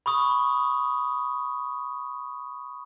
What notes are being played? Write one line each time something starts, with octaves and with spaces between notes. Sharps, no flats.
B5 C#6 D#6